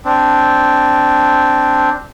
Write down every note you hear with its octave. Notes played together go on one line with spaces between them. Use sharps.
C4 D4